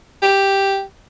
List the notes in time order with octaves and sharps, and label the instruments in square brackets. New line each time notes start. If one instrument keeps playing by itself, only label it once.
[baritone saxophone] G4